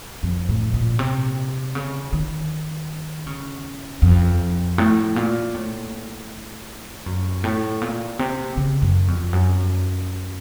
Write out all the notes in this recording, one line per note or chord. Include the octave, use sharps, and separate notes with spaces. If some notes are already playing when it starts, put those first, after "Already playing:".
F2
A2
A#2
C3
C#3
D#3
C#3
F2
A2
A#2
A2
F#2
A2
A#2
C3
C#3
F#2
F2
F#2